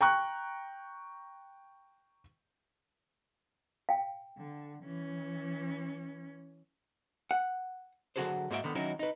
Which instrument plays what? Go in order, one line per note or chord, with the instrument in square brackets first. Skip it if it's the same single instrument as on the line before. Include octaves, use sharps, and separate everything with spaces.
[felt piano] G5 A#5 C#6 F#6
[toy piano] F5 G5
[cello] D3
E3 C#4
[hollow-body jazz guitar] F#5
D3 F#3 F#4 G#4 A4 C5
G#2 A#3 F#4 E5 G5
D3 D#3 B3
D#3 F#3 C#4 D#4 E4 F#4
D#4 B4